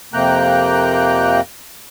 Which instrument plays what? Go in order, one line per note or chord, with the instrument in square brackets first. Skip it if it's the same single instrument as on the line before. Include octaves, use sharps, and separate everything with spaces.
[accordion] F2 C3 A#3 G5 A#5 F#6